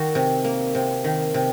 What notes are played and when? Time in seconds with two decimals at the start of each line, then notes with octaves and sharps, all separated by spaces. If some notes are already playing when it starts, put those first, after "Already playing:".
Already playing: D#3 F#4
0.15 C3
0.44 A#3
0.75 C3
1.04 D#3
1.34 C3